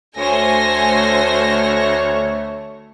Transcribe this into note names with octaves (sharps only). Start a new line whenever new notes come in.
D2 A3 C5 C#5 G#5 A#6